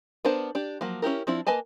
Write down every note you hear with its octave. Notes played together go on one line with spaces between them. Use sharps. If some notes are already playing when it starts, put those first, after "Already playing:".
B3 D4 A#4 C5 A5
D4 G4
F3 F#3 A#3
C#4 E4 G4 A#4
F3 C4 D4 E4
A#3 B4 D#5 G#5 A5